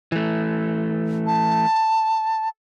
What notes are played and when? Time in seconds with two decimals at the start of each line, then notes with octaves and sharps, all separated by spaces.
0.12 E3 A3
1.27 A5